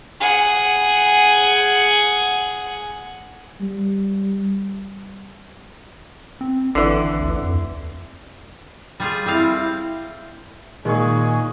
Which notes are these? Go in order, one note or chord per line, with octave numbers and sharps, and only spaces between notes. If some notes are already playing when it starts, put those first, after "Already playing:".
G#4 F#5
G3
C4
G#1 D3 E3
D2
F2
G3 F4 G#4
G3 C4 E4 F5
A#2 D#3 G#3 G#4 C#6